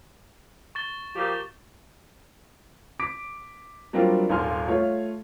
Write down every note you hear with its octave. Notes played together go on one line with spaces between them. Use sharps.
C#6 A6 G7
F3 A#3 G4
D6 B6 D7
F#3 G3 A#3 C4 D4 F4
D#1 G#1 D#2 G#5 C6 F6
A3 F4 C#5